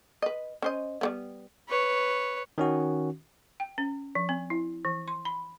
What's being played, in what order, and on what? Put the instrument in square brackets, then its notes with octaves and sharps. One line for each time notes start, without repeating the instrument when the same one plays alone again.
[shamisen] B4 D#5
C#4 C5 D#5
G3 A3 B3
[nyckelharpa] B4 C#5
[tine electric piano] D#3 C#4 F#4
[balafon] G5
C#4
F3
C4
E4
E3
C6
B5